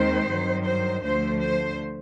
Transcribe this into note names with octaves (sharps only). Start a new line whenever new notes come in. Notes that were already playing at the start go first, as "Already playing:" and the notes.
Already playing: D#2 D#3 G#3 C4 C5
G2 D#3 F#3
C5
D2 D3 F3 A3 C5
C5